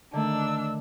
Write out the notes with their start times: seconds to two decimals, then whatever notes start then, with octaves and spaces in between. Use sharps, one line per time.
0.13 D3 D#3 A3 D4 E6